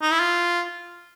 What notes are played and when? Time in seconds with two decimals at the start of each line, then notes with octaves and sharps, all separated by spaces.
0.02 D#4
0.11 E4
0.20 F4